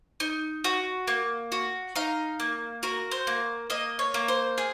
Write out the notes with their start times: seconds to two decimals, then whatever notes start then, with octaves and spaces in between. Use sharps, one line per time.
0.20 D#4
0.64 F#4
1.07 A#3
1.52 F#4
1.95 D#4 F5
2.40 A#3
2.83 F#4 A#4
3.11 C5
3.27 A#3
3.70 A#3 D#5
3.99 C#5
4.14 A#3
4.28 C5
4.58 G#4